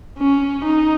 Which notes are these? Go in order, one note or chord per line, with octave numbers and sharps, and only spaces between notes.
C#4
D#4